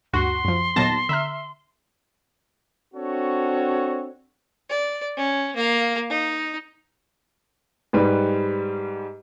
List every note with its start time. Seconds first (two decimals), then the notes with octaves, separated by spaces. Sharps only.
0.13 D2 G2 F#4 C6
0.45 F#2 F3
0.76 D#2 A#2 F#3 B3 A5 A#6
1.09 D3 E5 A#5 F6
2.94 C4 D4 F#4 A4 C#5
4.70 D5
5.16 C#4
5.56 A#3 F5
6.10 D#4
7.93 G#2 G3 B4